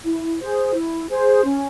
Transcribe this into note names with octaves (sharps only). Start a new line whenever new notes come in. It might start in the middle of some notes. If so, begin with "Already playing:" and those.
E4
G#4 C5
E4
G#4 C5
C#4